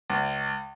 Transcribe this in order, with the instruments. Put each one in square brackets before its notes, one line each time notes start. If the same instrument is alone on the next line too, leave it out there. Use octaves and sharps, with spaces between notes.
[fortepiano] C#2